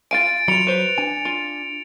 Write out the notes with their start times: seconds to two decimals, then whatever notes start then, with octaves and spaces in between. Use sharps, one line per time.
0.11 F4 F5 G#5 A6 D7
0.48 F#3 F4 B5 C#7 F7
0.67 B4 C5
0.98 D4 G#5
1.25 F4